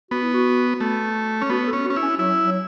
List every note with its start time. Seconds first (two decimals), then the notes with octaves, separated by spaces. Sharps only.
0.11 B3 F#4
0.23 E4
0.34 F#4
0.80 A3
1.42 C#4
1.50 B3 F#4
1.68 A4
1.73 C#4
1.85 F#4
1.90 C#4
1.96 E4
2.02 C#4
2.19 F#3 E4
2.44 F#3